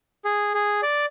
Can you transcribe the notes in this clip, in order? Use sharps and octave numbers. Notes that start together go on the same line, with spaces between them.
G#4
G#4
D5